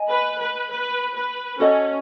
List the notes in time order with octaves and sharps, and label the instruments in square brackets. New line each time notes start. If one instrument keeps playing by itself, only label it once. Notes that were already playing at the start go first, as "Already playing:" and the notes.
Already playing: [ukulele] D#5 G#5
[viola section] B4
B4
B4
B4
[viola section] C#4 [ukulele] F#4 A4 D#5